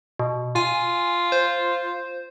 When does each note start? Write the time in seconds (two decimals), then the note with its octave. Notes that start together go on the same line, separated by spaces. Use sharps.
0.19 B2
0.56 F4 G#5
1.32 C5